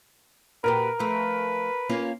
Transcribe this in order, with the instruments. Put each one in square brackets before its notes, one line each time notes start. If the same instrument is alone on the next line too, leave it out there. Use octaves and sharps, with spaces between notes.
[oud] A#2 F#4 G4 [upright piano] A#4 [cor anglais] B4
[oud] F3 A3 [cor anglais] B4
[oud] A#3 C#4 F4